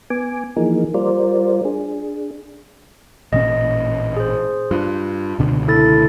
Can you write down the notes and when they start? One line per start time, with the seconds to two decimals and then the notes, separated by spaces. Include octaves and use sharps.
0.10 B3 G#5 D6
0.56 E3 F3 A#3 D#4 G#4 A#4
0.94 G3 F4 A#4 C5 D5
1.65 D4 G#4
3.33 A1 A#2 C#4 D#5
4.16 G#4 C5
4.71 G2 F4
5.39 C#2 B2 D3
5.68 E4 A4 A6